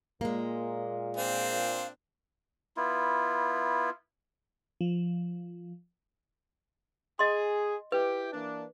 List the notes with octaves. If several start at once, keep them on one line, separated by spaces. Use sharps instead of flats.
A#2 G#3 A#3
C4 D4 F5
B3 E4 F4
F3
G#4 D#5 C6
E4 G4 B4
E3 A#3 D4